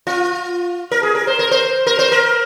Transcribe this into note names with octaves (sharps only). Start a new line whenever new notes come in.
F4
A#4
G#4
A#4
C5
A#4
C5
A#4
C5
A#4